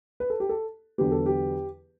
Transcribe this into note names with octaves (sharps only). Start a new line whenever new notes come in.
B4
A4
G4
A4
E2 D3 F#3 B3 G4
A4
G4